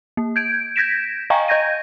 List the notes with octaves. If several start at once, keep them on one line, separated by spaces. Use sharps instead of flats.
A#3
G6 G#6 D7
G6 G#6 A#6 B6 D7 E7
D#5 F5 G5 G#5 A#5 C#6
D#5 G6 G#6 A#6 D#7